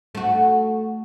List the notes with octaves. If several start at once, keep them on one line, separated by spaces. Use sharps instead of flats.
A3 F#4